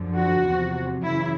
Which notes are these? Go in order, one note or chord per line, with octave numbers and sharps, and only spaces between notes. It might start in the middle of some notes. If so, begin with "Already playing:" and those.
Already playing: F#2 D3 F3
F#4
E2 C3 F3
F#2 C#3 E3 E4